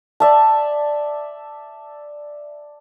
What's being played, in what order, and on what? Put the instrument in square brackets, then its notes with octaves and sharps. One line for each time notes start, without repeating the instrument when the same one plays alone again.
[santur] D5 E5 A5